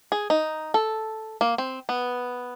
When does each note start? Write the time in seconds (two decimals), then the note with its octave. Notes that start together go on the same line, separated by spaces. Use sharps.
0.12 G#4
0.30 D#4
0.74 A4
1.41 A#3
1.58 C4
1.89 B3